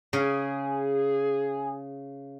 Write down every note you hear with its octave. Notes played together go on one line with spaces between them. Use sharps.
C#3 G#4